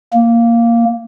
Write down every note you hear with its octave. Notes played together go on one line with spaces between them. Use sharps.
A#3